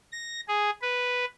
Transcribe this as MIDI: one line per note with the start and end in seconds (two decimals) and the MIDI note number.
0.12 0.40 94
0.48 0.70 68
0.82 1.25 71